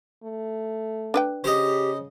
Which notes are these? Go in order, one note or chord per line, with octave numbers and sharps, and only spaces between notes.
A3
D4 B4 G5
C#3 G4 C5 D#5